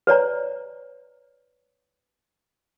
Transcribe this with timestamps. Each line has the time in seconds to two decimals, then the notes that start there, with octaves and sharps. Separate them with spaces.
0.07 B4 C#5 D5 A#5